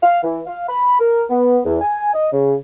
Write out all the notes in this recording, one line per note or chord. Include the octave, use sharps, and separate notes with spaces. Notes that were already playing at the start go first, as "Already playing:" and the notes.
F5
E3
F5
B5
A#4
B3
E2
G#5
D#5
C#3